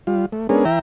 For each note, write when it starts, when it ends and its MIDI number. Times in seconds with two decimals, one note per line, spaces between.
0.07 0.26 55
0.07 0.26 65
0.32 0.47 57
0.49 0.65 56
0.49 0.65 59
0.49 0.65 61
0.49 0.65 62
0.49 0.65 68
0.49 0.65 70
0.65 0.79 52
0.65 0.79 76
0.65 0.79 79
0.65 0.79 82